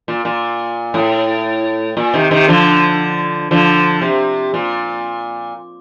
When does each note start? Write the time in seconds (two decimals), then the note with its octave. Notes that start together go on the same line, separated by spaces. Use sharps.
0.08 A#2
0.25 A#2
0.94 A2
1.97 A#2
2.14 C3 D#3
2.31 C3 D#3
2.48 D3 F3
3.51 D3 F3
4.01 C3
4.54 A#2